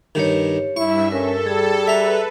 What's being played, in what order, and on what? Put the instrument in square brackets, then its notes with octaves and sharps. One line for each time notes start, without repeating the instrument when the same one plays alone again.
[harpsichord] G2 D#3 [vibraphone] G4 C#5
[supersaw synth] G2 E5 [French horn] E4 [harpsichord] C#6
[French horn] C#4 [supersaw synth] A4 [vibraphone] A#4
[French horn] G3 [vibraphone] G#4
[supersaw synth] B4 [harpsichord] E5 A#5